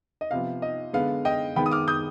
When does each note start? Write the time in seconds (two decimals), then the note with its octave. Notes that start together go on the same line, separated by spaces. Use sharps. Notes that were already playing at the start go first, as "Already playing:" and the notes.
0.21 D#5
0.31 C3 F3 B3 F5
0.62 D#5
0.93 D3 G#3 B3 F5
1.25 D#5 G5
1.56 D#3 G#3 B3 G5 B5
1.66 D#6
1.71 D6 F6
1.88 D#6 G6